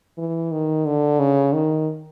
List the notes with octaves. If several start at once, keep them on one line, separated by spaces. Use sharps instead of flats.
E3
D#3
D3
C#3
D#3